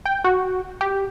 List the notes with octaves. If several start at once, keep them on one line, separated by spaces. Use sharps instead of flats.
G5
F#4
G4